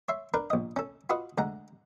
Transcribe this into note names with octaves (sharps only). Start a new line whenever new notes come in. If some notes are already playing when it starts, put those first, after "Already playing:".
C#5 E5 C6
D4 A#4 B4
A#1 D#5
C#4 A4
F4 F#4 B4 D#5 C#6
D2 G#3 F#5 A#5